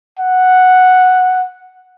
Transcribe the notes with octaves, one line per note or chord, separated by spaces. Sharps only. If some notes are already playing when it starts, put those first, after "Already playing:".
F#5